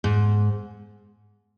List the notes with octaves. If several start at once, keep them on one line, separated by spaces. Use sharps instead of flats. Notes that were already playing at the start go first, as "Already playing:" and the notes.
G#2